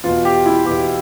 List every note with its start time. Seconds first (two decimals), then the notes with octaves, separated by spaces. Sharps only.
0.04 E2 B2 F4
0.25 G4
0.46 E4
0.66 E2 B2 G4